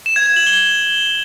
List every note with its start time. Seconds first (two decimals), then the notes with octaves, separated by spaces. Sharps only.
0.06 E7
0.16 G#6
0.26 G#6
0.36 F#7
0.47 G7